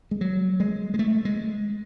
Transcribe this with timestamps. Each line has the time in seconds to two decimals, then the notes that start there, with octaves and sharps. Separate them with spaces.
0.11 G#3
0.21 F#3
0.60 G#3
0.94 G#3
0.99 A3
1.25 G#3